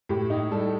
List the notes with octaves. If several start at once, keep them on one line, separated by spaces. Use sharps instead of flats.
A2 G4
D#4
G3 A4